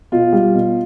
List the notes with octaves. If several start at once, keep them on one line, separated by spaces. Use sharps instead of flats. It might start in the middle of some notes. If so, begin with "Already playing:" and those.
B2 F4
G3
B2